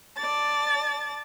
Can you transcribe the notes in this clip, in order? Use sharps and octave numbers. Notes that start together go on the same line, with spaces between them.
D5 A5 A6